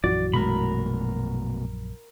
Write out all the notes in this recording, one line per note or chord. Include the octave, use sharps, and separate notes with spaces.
A#1 F#2 E3 F#4 D5
B2 G#3 A3 A#4 B5